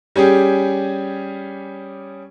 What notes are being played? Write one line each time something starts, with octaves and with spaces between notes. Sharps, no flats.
G3 C#4 G4 G#4